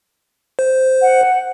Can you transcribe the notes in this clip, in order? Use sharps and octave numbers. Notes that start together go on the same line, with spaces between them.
C5
F#5